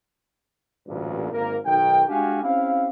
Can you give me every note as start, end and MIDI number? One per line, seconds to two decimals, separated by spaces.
0.88 1.28 33
0.88 1.28 38
0.88 1.28 43
0.88 1.28 46
1.32 1.57 32
1.32 1.57 58
1.32 1.57 70
1.66 2.03 35
1.66 2.03 51
1.66 2.03 79
2.09 2.43 56
2.09 2.43 62
2.09 2.43 66
2.09 2.43 67
2.09 2.43 77
2.09 2.43 80
2.43 2.88 60
2.43 2.88 61
2.43 2.88 64
2.43 2.88 67
2.43 2.88 77